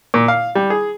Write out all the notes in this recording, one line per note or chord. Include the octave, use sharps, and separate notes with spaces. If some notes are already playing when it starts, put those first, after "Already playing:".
A#2
F5
G3
G#4